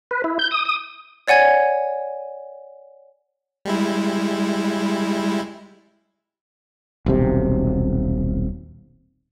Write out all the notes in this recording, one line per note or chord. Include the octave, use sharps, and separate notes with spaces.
B4
E4
G6
D#6
D#6
C#5 D5 F#5 G#5 G#6
G3 G#3 E4
D#1 B1 C3